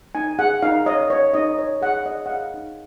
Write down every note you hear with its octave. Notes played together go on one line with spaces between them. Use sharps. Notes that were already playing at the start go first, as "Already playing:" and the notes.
D#4 G#5
G#4 F#5
D#4 F5
C#5 D#5
C#5
D#4 D#5
C#5
G#4 F#5
C#5 D#5
F#5
G#4 F5
D#4